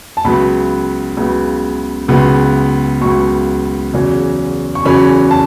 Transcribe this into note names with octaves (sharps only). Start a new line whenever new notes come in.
A5
C#2 C#3 F#3 B3 B5
C#2 C#3 F#3 B3
C#2 C#3 F#3 B3
C#2 C#3 F#3 B3 C#6
E2 C#3 F#3 C#4
C#6
E2 C#3 F#3 C#4 B5
A5